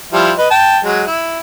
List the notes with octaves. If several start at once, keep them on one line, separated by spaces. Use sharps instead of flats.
F3 G3 E4
B4 D#5
G5 A5
F#3 G#3
E4